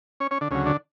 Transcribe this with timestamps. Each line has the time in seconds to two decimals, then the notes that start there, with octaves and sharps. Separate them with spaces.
0.20 C#4 C#5
0.31 C#4 C#5
0.41 D3 D4
0.51 D2 C#3 F#3 C#4
0.66 D3 D4